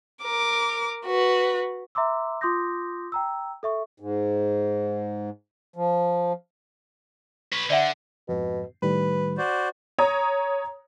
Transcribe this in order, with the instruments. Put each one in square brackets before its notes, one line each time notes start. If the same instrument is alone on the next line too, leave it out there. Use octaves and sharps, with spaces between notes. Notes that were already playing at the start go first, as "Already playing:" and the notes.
[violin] A#4 D6
F#4 B4
[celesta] E5 A#5 C6 D6 E6
F4 C6 D6 D#6 G6 A#6
G5 A#5 E6
A4 E5 C#6
[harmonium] G#2
F3
[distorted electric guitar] B4 C#5
[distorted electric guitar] D3 [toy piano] D5 E5 F#5
[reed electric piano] F2 G#2 [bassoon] B2
[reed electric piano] A2 D#3 G3 [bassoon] B4
[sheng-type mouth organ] F#4 C5 D5
[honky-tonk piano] C#5 A#5 D#6